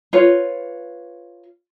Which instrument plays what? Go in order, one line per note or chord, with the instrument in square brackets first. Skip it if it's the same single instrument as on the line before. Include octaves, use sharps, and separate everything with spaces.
[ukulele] F4 B4 C#5